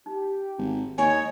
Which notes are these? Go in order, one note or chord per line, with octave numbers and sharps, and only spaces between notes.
D#4 G4
G#1
D#2 C#5 D#5 G#5